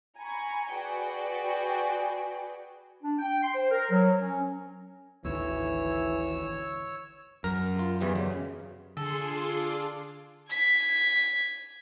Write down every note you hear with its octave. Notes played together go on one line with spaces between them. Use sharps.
G#5 A#5 B5 C#6
F#4 G#4 B4 D5 G5
D4
G5
C6
C5
A#4
F#3
C#4
G#1 D2 E3 C#5 E6
F#2 A#4
F4
E2 E3 G3
C#3
D3 D4 F4 G#4 A4 C6 D6
G#6 B6